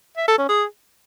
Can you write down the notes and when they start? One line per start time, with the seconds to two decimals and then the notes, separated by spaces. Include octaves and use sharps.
0.17 E5
0.28 A4
0.38 C#4
0.49 G#4